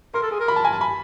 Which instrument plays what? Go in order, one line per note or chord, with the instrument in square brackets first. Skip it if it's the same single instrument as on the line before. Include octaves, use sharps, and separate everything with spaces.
[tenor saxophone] A#4 [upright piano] C6
[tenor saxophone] A4
G#4
A#4
[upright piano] B5
A5
G#5
A5
B5